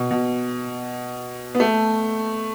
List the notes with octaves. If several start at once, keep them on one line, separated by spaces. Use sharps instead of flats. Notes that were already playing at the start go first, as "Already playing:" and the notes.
Already playing: B2
B2
B3
A3